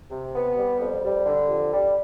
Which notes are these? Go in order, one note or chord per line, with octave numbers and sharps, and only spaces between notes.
C3
B3
G3
F2
G3
D3
F2
G3